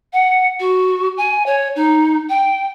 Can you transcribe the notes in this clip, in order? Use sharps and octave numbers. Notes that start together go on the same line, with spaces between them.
F#5
F#4
G#5
C#5
D#4
G5